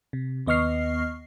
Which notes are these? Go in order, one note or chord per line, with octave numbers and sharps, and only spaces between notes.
C3
D#2 B3 D#5 C#6 F6 C7